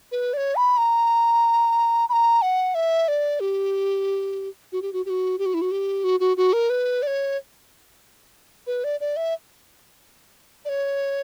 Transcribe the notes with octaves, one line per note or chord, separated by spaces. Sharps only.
B4
D5
C#5
B5
A#5
B5
A#5
F#5
E5
D5
G4
F#4
G4
F#4
G4
F#4
G4
F#4
E4
F#4
G4
F#4
F#4
F#4
A#4
B4
D5
C#5
B4
D5
D5
E5
D5
C#5